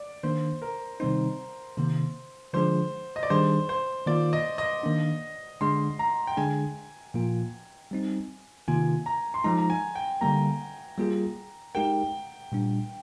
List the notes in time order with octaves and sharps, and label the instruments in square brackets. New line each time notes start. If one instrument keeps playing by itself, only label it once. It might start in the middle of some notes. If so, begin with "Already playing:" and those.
Already playing: [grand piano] D5
[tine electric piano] D#3 A#3 D4 [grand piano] C5
[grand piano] A#4
[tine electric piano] C3 D#3 G3 C4 D#4 [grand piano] C5
[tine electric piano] C3 D#3 A#3
[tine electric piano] D3 F3 G#3 D4 G#4 [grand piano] C5
[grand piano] D#5
D5
[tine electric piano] D#3 G3 D4 G#4 [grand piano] C5
[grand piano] C5
[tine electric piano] D#3 A#3 F4 [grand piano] D5
[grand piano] D#5
D#5
[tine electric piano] D#3 A#3 D4
[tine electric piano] D3 G#3 D4 G#4 [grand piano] C6
[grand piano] A#5
G5
[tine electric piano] D3 G#3 D4 G#4 [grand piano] G#5
[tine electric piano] A#2 F3 A#3 F4
G3 C4 D#4
[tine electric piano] C3 D#3 A#3 F4 [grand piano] G#5
[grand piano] A#5
C6
[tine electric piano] F3 G#3 D#4 [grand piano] A#5
[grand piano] A#5
G#5
G5
[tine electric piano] D3 G3 A#3 [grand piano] A#5
[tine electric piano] G3 A#3 F4 G#4
[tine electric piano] G#3 D#4 G4 A#4 [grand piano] G5
[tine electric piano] A#2 G3 D4